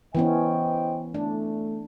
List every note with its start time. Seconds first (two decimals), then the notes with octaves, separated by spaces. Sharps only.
0.15 E3 B3 C#4 C5 D#5 G5
1.14 A3 D4